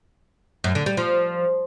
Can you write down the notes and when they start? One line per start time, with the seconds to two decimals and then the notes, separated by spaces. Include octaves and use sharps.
0.64 F#2
0.75 D3
0.86 G3
0.97 F3